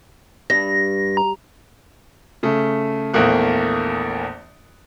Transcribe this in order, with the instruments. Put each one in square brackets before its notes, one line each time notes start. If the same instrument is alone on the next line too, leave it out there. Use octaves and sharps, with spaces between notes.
[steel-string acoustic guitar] G2 [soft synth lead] A#6
[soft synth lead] A#5
[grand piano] C#3 A3
A#1 E2 A3 A#3 F#6